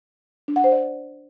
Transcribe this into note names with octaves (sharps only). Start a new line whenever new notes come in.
D4
F#5
C5
D5